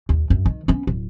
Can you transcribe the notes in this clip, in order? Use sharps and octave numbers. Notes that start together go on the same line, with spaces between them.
D#2
F#2
D#3
B3 C#4
D1